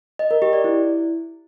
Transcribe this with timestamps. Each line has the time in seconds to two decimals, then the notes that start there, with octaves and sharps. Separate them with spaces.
0.19 D#5
0.31 A#4
0.42 G4
0.53 D5
0.64 E4